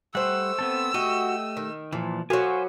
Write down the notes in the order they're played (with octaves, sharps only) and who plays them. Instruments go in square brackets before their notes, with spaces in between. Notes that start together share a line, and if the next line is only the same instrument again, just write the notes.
[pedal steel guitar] G3 F#5 [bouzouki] A3 C5 [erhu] E6
[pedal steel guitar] B3 C4 A4
[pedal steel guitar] A3 G4 D#5 [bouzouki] F#4
[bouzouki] D#3
[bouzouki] A#2 [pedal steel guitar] E3 F3
[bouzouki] F#3 B4 [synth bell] F#4 [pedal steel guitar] C5 F5 G#5